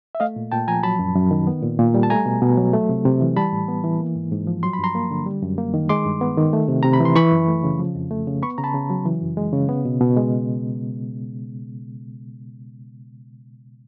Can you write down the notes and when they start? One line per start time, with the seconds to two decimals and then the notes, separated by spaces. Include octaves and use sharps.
0.15 E5
0.20 A3 D#5 F5
0.36 A#2
0.52 A#2 G5 A5
0.68 F3 G#5 A#5
0.83 F#3 A5 B5
0.99 F#2
1.15 F#2
1.31 D#3
1.47 B3
1.62 A#2
1.79 A#2
1.94 G3
2.03 A5
2.10 A3 G#5 A#5
2.26 B2
2.42 B2
2.58 F#3
2.73 A3
2.89 C3
3.05 C3
3.21 E3
3.36 G3 A5 B5
3.52 A2
3.68 B3
3.84 E3
4.00 A#3
4.16 G#2
4.32 G#2
4.47 F3
4.63 F#3 C6
4.73 B5
4.79 G2 A#5 C6
4.95 A#3
5.11 D3
5.26 G3
5.42 F#2
5.58 A#3
5.74 D#3
5.89 G#3 C6 D6
6.05 G2
6.21 B3
6.37 D#3
6.53 A3
6.68 C3
6.83 C3 A#5
6.93 B5
7.00 E3 C6
7.16 E3 B5 C#6
7.32 F#2
7.48 A3
7.64 C#3
7.79 F3
7.95 F2
8.11 A3
8.27 C#3
8.43 B3 B5 C#6
8.58 C#3 A#5
8.64 A5 B5
8.74 C#3
8.90 F#3
9.06 E3
9.22 F#2
9.37 G#3
9.53 C#3
9.69 B3
9.85 B2
10.00 B2
10.17 G#3